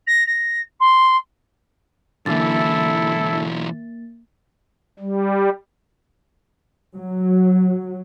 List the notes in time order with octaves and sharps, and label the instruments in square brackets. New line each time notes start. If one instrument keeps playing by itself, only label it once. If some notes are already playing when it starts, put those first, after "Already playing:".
[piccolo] A#6
A#6
C6
[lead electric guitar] B1 E3 [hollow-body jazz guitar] F#2 D3 [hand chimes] A#3 A6 [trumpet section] E4 A4
[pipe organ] G3
[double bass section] F#3